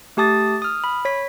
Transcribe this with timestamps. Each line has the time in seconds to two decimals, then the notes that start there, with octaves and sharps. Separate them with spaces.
0.17 A3 G4 A5 D#6 A6
0.62 D#6 F6
0.84 B5
1.05 C#5 B6